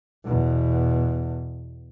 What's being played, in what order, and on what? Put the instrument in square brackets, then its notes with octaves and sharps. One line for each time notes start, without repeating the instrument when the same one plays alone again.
[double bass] E2 B2